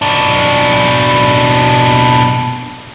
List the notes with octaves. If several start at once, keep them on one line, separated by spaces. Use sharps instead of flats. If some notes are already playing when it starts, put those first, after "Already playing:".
B2 D4